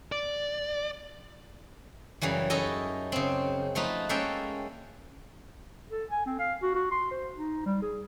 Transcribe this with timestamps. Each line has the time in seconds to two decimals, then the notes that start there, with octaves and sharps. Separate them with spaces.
0.12 D5
2.21 F#2 C#3 E3 G3
2.50 C#4 D#4 E4 A4 D#5
3.12 C#3 C4
3.75 F3 A3 D#4 F4 B4
4.09 G#3 A#3 C#4 A4 E5 G5
5.91 A4
6.10 G#5
6.26 C4
6.39 F5
6.63 F#4
6.75 F#4
6.91 C6
7.11 C5
7.36 D#4
7.66 G3
7.82 G#4